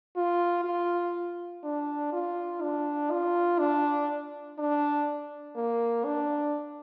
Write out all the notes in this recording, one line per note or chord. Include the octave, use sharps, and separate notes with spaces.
F4
F4
D4
F4
D4
F4
D4
D4
A#3
D4